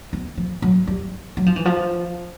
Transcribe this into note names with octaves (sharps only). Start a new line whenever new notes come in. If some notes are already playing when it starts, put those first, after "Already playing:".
B3
F3
F#3
G3
F#3
F3
E3
F3